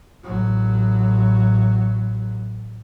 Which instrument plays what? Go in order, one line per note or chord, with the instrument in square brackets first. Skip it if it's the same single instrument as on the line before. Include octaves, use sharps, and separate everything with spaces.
[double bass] A1 F#3